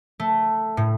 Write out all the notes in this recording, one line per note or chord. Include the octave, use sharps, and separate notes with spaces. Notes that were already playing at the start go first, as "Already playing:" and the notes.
A3
A2